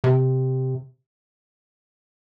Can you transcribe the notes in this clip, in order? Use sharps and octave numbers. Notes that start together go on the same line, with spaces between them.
C3